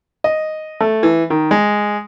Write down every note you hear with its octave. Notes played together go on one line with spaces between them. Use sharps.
D#5
A3
E3
D#3
G#3